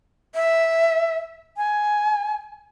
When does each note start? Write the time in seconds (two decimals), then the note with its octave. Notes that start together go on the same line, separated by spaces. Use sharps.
0.35 E5
1.57 G#5